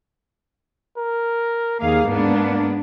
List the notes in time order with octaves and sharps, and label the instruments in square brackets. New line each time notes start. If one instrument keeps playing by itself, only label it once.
[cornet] A#4
[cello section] D#2 G#4 F5 [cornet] A#3
[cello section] G#2 B3 D4